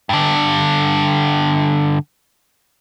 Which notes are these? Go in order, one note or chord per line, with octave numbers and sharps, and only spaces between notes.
G2 D3